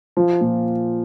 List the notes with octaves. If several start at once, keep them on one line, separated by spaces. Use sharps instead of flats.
F3
A#2